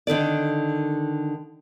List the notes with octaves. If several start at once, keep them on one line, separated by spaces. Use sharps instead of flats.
D3 D#3 A4 D5